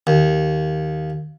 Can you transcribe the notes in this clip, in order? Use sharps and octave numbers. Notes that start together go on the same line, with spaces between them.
D#2